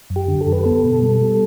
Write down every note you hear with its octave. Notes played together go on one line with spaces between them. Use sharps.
F#2
G4
D3
A4
F#2
B4
B3 A4
B2
G3
G3